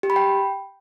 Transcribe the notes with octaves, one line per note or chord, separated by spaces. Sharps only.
G4
B5
G5